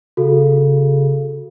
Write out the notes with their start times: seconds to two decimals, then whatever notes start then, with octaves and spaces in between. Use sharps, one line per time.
0.17 C#3 F#4 A4